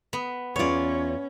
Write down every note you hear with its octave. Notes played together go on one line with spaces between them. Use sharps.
B3
E2 C#4 F4 C#5 D5